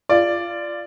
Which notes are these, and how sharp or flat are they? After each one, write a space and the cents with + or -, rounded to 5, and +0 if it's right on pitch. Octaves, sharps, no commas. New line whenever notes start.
F4 -15 D5 +0